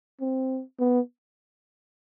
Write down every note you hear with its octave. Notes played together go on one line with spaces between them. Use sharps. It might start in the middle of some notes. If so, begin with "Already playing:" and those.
C4
B3